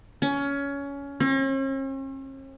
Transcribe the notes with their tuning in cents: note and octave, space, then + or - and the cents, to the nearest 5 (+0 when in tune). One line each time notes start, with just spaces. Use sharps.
C#4 +20
C#4 -45